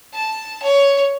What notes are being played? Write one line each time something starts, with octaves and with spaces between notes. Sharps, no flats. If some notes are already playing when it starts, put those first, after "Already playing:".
A5
C#5